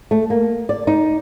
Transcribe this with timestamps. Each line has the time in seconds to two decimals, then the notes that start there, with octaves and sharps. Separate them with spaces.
0.11 A3
0.30 A#3
0.69 D5
0.87 D#4